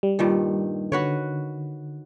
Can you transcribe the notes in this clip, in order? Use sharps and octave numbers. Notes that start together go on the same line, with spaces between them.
G3
G2 A#2 D#3
D3 F#4 B4 C#5